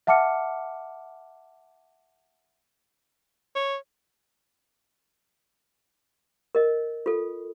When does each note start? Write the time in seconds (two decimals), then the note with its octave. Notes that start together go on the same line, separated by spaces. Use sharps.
0.07 E5 F#5 A5 D6 F6 C#7
3.55 C#5
6.55 A#4 D#5
7.06 F4 A4